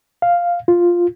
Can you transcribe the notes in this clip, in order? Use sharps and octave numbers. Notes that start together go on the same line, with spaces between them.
F5
F4